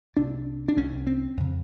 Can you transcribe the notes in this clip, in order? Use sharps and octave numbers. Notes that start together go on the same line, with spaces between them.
C2 C3 D4
D4
C2 C3 C#4
C4
F2 C#3